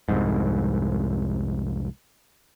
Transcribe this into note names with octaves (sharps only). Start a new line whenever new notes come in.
C2 F2 G#2